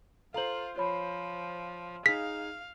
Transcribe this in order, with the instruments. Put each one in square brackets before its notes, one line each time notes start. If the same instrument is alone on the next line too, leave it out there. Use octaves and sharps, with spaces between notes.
[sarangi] F4 [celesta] A4 A#5 F#7 [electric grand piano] C5 F5
[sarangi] F3 [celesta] F4 C#5 B5
[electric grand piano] D#4 G#4 [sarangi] F5 [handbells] B6